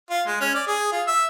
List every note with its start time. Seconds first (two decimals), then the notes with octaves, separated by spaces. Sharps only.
0.10 F4
0.27 G#3
0.41 C#4
0.55 D5
0.67 G#4
0.92 F4
1.07 E5